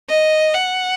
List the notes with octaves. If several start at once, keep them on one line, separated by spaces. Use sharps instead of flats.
D#5
F#5